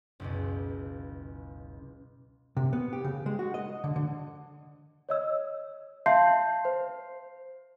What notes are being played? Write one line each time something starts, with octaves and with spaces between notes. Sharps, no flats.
F#1 C#2 B2
C3
B3
G4
C#3
G#3
F#4
D#5
D3
D3
C#5 D#5 E6
E5 F5 A5 C6 G6 C7
C5